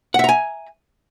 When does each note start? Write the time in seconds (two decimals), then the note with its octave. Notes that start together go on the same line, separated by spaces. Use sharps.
0.14 F#5
0.19 E5
0.24 A#5
0.29 G#5